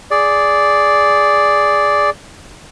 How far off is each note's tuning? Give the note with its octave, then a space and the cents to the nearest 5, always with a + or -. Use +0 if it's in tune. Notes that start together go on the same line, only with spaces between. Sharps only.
G#4 +0 D5 -5